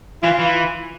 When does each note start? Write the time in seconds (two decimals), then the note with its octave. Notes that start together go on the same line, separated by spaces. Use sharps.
0.23 E3 F4
0.39 E3